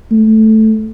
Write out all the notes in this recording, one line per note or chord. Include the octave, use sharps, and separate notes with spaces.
A3